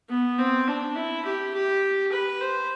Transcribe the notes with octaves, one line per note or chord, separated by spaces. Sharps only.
B3
C4
D4
E4
G4
G4
B4
C5